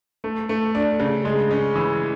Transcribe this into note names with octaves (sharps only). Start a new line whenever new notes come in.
A3
A3
D4
C#3
G#3
C#4
E3